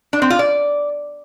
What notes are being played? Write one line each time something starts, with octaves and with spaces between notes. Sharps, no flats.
D4
C4
F4
D5